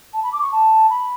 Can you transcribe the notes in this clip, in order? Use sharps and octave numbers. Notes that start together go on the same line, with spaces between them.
A5
B5
D6
C#6
A5
B5